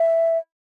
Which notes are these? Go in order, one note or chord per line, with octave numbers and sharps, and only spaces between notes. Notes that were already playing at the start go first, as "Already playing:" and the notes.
Already playing: E5